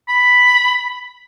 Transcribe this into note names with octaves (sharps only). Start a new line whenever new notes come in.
B5